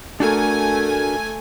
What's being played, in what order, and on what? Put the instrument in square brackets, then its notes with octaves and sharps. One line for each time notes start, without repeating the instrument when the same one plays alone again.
[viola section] A3 G#5 [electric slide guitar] D4 F#4 A#4